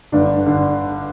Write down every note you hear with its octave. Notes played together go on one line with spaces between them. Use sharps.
G1 G2 D3 D4
D3